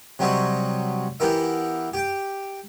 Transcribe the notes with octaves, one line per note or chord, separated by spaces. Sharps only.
C3 F#3 G3 C4 F#4 D#5
E3 B3 E4 G4 A#4 E5
G4 G5